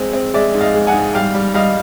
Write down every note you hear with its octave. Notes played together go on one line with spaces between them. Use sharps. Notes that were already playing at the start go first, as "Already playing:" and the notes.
Already playing: G#3 C4
C4
G#3 D5 E5
G#2
D#5 F5
G#3
F#5 G#5
G#2
G3 F5 G5
G3
G3 D#5 F5